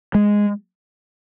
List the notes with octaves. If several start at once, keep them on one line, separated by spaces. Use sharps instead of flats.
G#3